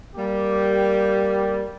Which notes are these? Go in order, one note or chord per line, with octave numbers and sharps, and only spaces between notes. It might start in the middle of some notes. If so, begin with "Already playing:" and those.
G3 A#3 G4